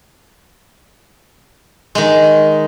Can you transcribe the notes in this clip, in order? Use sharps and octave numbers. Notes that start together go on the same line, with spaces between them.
D#3 G#3